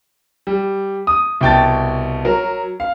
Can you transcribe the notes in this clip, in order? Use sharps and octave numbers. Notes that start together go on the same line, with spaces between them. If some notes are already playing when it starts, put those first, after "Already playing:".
G3
D#6
C2 B2 G5 A5 A6
F#3 A#4
F5